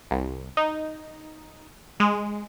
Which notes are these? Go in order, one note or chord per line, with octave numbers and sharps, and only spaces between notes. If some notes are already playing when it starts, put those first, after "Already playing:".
C2
D#4
G#3